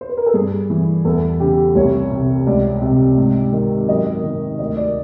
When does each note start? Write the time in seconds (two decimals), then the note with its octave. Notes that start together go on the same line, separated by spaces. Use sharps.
0.01 C5
0.09 B4
0.17 A#4
0.26 A4
0.34 G2 G#4
0.70 E3
1.05 E2 A4
1.40 C#3 G4
1.75 C2 C#5
2.12 C3
2.47 C#2 D5
2.82 C3
3.17 G#2
3.52 D#3
3.88 F#2 D#5
4.24 D#3
4.59 D2 D#5
4.77 D5